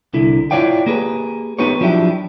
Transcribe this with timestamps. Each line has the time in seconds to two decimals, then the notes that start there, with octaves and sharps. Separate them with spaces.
0.14 C2 D3 E4
0.51 E4 F4 C#5 D5 F5 G5
0.86 A#3 G4 G#4 B4
1.59 B3 D#4 G4 B4 C#5
1.81 F3 F#3 D4 E4 G4